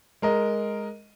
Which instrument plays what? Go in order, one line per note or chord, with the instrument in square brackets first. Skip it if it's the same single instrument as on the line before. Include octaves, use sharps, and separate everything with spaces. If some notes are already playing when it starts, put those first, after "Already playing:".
[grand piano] G#3 A#4 D#5